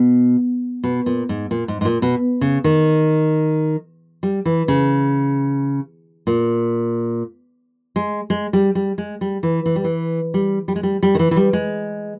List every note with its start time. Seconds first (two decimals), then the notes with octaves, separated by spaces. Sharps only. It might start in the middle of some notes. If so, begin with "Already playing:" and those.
Already playing: B2
0.84 B2
1.06 A#2
1.29 G#2
1.51 A#2
1.68 G#2
1.81 G#2
1.85 A#2
2.02 B2
2.41 C#3
2.64 D#3
4.23 G3
4.45 E3
4.68 C#3
6.27 A#2
7.96 G#3
8.30 G#3
8.53 G3
8.75 G3
8.98 G#3
9.21 G3
9.43 E3
9.66 E3
9.76 G3
9.84 E3
10.34 G3
10.68 G3
10.76 G#3
10.83 G3
11.03 G3
11.15 D#3
11.19 E3
11.31 E3
11.36 G3
11.53 G#3